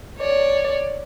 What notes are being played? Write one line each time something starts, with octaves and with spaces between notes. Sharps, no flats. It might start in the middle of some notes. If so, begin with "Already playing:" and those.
C#5 D5